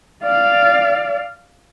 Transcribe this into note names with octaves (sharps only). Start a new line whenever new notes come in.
D5 F5